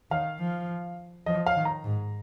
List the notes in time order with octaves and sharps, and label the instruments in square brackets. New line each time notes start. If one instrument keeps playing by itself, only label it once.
[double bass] D#3 [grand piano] F5
[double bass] F3
[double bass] F3 [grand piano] D#5
[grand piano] F5
[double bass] D#3
[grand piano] A#5
[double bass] G#2